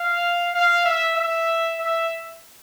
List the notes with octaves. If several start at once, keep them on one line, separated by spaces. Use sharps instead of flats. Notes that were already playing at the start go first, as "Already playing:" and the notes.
Already playing: F5
F5
E5
E5
E5